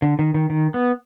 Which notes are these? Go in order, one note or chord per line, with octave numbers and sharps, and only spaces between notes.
D3
D#3
D#3
D#3
B3